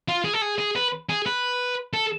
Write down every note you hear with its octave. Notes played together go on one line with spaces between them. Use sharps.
F4
G#4
A4
G#4
G#4
B4
G#4
B4
A4